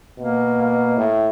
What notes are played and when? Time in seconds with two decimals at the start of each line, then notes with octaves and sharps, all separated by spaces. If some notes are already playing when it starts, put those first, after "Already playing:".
0.18 B2 A#3
0.61 A#3
0.97 A2